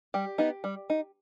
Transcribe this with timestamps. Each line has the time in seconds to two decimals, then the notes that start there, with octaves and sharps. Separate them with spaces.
0.14 G3 G4
0.38 B3 D#4
0.64 G3
0.90 D#4